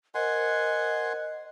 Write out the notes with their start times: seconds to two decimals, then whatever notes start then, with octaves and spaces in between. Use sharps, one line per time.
0.15 A#4 C5 D#5 F#5 G#5 C6